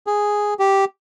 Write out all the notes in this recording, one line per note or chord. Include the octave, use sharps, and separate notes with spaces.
G#4
G4